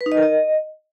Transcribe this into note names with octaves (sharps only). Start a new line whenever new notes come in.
B4
D#4
D#5
A#4
D#5